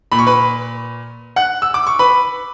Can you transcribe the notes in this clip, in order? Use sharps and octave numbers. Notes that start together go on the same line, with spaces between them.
A#2 B5
C#6
B4 B5
F#5 F#6
E6
D6
C#6
B4 B5